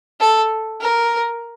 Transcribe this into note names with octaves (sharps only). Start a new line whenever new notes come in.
A4
A#4